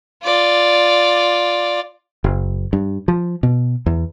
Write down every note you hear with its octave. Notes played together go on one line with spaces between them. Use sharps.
F4 D5
F#1
G2
F3
B2
E2